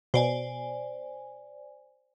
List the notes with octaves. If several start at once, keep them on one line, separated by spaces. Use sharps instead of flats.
B2 C5 D5 G#5